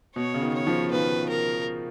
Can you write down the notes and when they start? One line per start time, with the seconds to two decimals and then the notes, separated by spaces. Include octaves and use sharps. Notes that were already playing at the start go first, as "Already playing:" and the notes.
0.15 B2 C#5
0.34 C#3
0.42 B2 D#3
0.54 C#5
0.67 C#3 F3
0.91 B2 D#3 B4
1.30 A#4